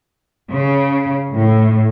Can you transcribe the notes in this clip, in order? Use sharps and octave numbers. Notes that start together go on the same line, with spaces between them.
C#3
A2